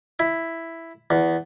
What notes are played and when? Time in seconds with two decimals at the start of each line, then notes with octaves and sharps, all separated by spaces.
0.19 E4
1.10 E2